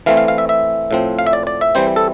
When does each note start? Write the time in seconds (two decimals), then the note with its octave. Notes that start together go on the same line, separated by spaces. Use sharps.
0.06 E3 A3 C4 F5
0.17 F5
0.28 F5
0.38 E5
0.49 E5
0.91 A2 F3 C4
1.19 F5
1.27 E5
1.33 D5
1.47 D5
1.61 E5
1.75 E3 G3 C4 C5
1.96 A4